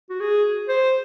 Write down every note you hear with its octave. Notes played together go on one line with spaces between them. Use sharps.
F#4
G#4
C5